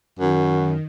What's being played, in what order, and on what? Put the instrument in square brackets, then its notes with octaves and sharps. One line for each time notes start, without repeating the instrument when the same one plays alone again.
[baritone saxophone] F#2 [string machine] D#3 [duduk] F#4